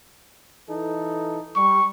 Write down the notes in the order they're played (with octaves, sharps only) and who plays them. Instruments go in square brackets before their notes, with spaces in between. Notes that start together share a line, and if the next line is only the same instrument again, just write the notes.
[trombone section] E3 D#4 A4
[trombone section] G3 [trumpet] C#6